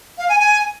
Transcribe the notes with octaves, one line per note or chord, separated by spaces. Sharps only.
F5
G#5
G#5